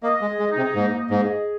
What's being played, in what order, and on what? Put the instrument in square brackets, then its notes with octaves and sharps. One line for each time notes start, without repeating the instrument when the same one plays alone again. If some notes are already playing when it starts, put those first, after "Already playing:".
[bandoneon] A#3 [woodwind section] D#5
[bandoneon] G#3
[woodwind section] G#4
[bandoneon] G#3
[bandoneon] C3 [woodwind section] D#4
[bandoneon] G#2 [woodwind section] A#3
[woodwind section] D#5
[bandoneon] G#2
[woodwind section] G#4